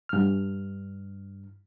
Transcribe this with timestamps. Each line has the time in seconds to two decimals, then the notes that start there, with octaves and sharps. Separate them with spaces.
0.09 G2 F6